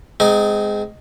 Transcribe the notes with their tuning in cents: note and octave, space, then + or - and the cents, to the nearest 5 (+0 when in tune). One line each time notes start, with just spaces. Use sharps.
G#3 +0 C4 -35 D#4 +0